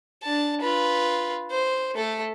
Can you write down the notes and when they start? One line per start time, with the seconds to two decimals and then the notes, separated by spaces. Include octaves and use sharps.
0.23 D4 A5
0.61 F4 B4
1.51 C5
1.95 A3 A4